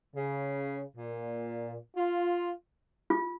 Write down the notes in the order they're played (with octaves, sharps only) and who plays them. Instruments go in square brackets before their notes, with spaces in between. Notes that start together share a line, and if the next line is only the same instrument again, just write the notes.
[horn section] C#3
A#2
F4
[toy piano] F4